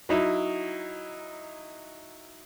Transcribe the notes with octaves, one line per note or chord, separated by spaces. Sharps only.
F#3 D#4 E4